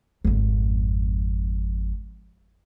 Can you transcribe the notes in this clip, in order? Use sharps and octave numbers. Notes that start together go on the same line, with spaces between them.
G#1 F2